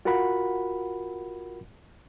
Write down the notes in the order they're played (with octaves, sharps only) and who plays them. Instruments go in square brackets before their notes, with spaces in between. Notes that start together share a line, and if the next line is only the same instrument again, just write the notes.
[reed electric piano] F4 F#4 A#4 F#5 B5